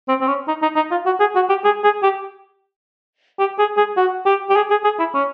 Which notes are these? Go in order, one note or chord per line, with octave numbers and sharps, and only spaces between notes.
C4
C4
C#4
D#4
D#4
D#4
F4
F#4
G#4
F#4
G4
G#4
G#4
G4
G4
G#4
G#4
F#4
G4
G4
G#4
G#4
G#4
E4
C#4